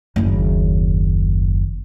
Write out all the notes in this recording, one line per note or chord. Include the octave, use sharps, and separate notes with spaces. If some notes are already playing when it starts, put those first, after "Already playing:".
F#1 D#2